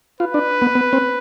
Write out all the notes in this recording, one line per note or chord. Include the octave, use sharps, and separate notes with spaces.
F4 B4
D4
B3
B3
C4